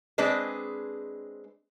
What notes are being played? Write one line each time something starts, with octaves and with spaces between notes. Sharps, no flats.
G#3 C4 D4 G#4 B4 D#5